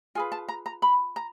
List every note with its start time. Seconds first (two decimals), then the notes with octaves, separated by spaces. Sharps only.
0.15 F4 G#4 B4 G#5
0.32 A5
0.48 A#5
0.66 A#5
0.82 B5
1.16 A#5